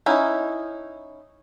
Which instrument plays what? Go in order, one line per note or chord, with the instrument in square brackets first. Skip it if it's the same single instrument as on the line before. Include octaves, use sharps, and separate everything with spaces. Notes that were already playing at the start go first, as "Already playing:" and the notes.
[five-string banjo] C#4 D#4 E4